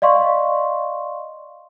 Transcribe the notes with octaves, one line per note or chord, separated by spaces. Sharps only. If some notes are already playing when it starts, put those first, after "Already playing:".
D5 D#5 F5 C6 C#6